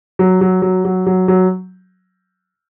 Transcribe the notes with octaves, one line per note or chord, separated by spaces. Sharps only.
F#3
F#3
F#3
F#3
F#3
F#3